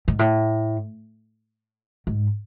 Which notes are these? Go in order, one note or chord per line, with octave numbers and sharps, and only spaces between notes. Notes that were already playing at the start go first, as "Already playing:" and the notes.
G#2
A2
G#2